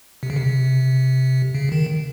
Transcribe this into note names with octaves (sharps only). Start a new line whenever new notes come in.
C3
C#3
C3
C#3
D#3